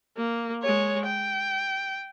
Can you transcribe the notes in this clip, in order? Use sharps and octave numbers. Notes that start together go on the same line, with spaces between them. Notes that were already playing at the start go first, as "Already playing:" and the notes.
A#3
G#3 C#5
G5